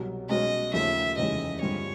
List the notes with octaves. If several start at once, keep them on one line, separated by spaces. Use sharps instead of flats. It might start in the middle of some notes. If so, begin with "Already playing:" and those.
Already playing: C2 B2 F#3
B1 B2 G#3 C#4 D#5
D#2 C#3 F3 A3 E5
F1 D#2 C#3 E3 G#3 D#5
G2 D3 F3 G#3 C4 C#5